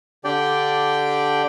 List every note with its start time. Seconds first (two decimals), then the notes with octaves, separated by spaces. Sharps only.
0.24 D3 D4 G4 D5 G5